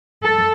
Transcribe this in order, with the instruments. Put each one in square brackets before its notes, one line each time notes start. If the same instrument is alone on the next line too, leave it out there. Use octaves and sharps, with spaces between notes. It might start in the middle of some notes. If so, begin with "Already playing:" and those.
[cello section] A4